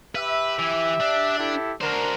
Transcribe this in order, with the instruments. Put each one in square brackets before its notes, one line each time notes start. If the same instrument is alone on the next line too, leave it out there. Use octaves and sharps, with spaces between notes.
[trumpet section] G4 E5 [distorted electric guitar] B4
[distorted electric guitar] E3
D4
[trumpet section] E4 G4 A4
[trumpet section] D4 A#4 [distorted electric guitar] F#4 C5